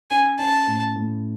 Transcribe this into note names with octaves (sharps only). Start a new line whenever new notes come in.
C#4 G#5
C#4 A5
A2
A2